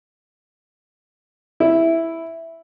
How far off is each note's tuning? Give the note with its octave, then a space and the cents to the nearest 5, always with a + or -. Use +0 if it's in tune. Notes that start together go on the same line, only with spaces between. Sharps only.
E4 +0